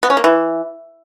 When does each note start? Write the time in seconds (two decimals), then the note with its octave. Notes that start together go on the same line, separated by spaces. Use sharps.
0.03 B3
0.10 C#4
0.17 A#3
0.24 E3